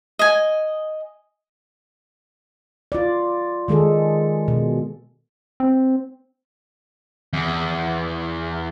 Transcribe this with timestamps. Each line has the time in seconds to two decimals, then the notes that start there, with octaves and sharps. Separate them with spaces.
0.19 D#5 G#5
2.92 F4 D5
3.68 D#3 G#3 G#4 A4
4.48 B2
5.60 C4
7.33 E2